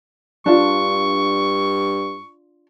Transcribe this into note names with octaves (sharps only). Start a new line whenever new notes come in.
G2 D4 F4 C#6